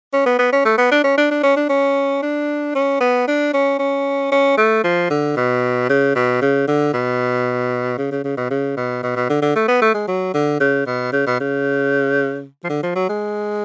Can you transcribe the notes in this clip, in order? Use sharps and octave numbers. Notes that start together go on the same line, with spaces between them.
C#4
B3
B3
C#4
A3
B3
D4
C#4
D4
D4
C#4
D4
C#4
D4
C#4
B3
D4
C#4
C#4
C#4
A3
F3
D3
B2
C#3
B2
C#3
D3
B2
C#3
C#3
C#3
B2
C#3
B2
B2
B2
D3
D3
A3
B3
A3
G#3
F#3
D3
C#3
B2
C#3
B2
C#3
F3
D3
F3
F#3
G#3